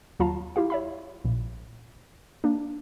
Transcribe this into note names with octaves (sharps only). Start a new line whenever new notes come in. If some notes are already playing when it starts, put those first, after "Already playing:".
D#2 F#3 F4 F5 A5 A#5
E4 F4 G4 F5
C#5 E5 B5
A#1 A#2
A#3 D4